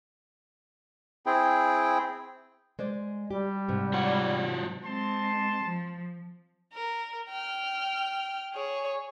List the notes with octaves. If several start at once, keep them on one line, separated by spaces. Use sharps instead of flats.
C4 E4 G#4 G5
G#3 C5 D5
G3 G4
G#2 C3
F#3 F4 F#5
G#3 C4 A5 C6
F3
A#4
G5 F6
G#4 C#5